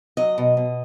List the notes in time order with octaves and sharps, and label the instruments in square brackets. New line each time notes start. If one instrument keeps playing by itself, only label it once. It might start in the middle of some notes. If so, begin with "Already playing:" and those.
[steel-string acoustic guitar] F#3 D#5
B2
B2